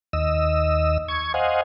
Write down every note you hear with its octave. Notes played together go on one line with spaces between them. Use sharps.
D#2 D#5 E6
C#6 G#6
C5 D#5 F5 F#5 G#5